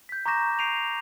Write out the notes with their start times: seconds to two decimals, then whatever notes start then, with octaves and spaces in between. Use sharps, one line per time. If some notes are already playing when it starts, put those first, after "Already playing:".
0.09 G6 B6
0.26 A#5 C#6 D6 G6 A#6 E7
0.59 C7 D7 D#7 F7